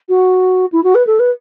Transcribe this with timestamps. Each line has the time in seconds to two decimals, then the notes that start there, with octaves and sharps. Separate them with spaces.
0.08 F#4
0.72 E4
0.83 F#4
0.94 B4
1.06 A4
1.19 B4